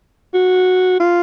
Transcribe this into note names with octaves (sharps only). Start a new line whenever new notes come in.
F#4
F4